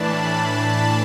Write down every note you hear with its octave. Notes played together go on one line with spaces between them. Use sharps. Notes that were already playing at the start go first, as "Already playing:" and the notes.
Already playing: A2 E3 D4 A5 B5
A5
A5